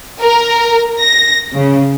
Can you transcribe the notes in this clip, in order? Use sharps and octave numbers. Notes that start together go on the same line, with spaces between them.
A#4
A#6
C#3